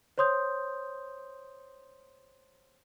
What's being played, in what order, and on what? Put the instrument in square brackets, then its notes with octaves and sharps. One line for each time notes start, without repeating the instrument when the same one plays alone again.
[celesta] C5 C#5 C6 D#6 G6